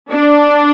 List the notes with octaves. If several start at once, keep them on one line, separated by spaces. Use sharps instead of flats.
D4